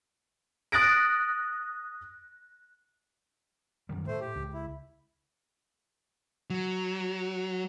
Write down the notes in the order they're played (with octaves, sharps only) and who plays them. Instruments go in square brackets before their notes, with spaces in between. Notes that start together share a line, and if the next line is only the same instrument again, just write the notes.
[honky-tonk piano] D#6 F#6 A6 A#6 D7
[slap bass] F#2 D#3 G3
[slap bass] A2 [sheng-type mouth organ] A3 C5
[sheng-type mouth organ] G4
[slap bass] C#2
[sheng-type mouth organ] E4
[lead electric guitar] F#3